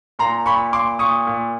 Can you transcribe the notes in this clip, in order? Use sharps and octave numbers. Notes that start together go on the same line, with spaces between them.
A#2 A#5 C6
A#2 B5 C#6
A#2 C6 D6
A#2 C#6 D#6
A#2